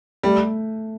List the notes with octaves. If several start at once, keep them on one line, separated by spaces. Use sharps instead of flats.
G3 A3